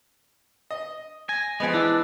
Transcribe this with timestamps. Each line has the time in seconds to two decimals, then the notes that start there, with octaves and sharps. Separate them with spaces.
0.70 D#5
1.29 G#5 A#6
1.60 F3 G#3 B3 G#4 B4 D#5
1.74 E3 D4 E6